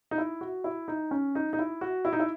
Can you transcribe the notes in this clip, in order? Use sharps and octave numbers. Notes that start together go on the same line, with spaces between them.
D#4
E4
F#4
E4
D#4
C#4
D#4
D#4
E4
F#4
E4
D#4
E4